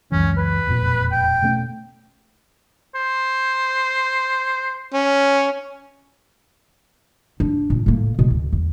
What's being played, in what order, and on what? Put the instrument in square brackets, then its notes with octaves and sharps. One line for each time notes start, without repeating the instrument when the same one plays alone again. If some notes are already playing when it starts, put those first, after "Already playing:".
[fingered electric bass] C#2 F#2 E3 [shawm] C#4
[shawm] B4
[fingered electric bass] E1 F2 A#2
[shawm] G5
[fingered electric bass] B2 A3 C#4
[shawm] C5
[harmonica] C#4
[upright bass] D4
A#2
A2 A#3
B2
D2
E2